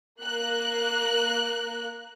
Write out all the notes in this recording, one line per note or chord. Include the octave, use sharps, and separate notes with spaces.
A#3 A#4 F#6